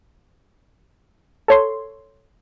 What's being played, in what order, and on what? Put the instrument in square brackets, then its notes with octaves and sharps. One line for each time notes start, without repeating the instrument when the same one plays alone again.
[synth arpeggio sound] A4 C#5 C6